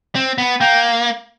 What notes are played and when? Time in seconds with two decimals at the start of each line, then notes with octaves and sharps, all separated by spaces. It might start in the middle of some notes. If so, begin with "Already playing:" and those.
0.15 C4
0.38 B3
0.61 A#3 G5